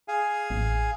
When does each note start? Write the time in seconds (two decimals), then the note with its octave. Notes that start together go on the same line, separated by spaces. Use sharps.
0.08 G#4 F5 G#5
0.50 A1